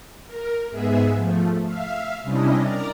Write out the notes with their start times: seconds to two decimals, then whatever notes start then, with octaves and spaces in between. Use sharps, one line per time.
0.26 A#4
0.70 G#2 G#3 B3 G#4 E5
1.14 F3 A3
1.66 E5 F5
2.23 C3 G3 C#4 D4 E4 D#5
2.62 A#4 D5 A#5